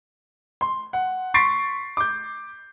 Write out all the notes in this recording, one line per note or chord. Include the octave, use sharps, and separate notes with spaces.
C6
F#5
C6 C#6 A6 B6 C7 D7
D6 G6